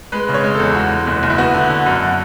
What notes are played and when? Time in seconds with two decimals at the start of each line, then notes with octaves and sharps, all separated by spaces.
0.12 G#3 B4
0.29 C#3
0.34 C#5
0.44 G#3
0.55 E2 A4
0.75 G#3 F#4
0.92 G#3
1.07 F#1
1.23 F#1
1.30 E4
1.38 B3 F#4
1.54 D3
1.70 D3
1.86 F#2